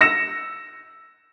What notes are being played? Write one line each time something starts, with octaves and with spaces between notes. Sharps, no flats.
E6 A#6 C#7 E7